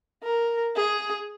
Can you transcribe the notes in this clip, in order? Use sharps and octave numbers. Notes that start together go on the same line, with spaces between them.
A#4
G#4